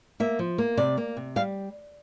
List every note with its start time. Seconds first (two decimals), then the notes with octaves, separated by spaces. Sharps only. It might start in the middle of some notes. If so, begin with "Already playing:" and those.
0.20 A#3 E5
0.39 F3
0.58 A#3
0.77 C3 D5
0.97 A#3
1.17 C3
1.36 G3 F5